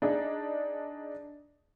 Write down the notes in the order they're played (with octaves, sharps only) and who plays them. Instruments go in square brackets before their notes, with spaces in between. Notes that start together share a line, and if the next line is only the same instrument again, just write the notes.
[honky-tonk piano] D4 D#4 G#4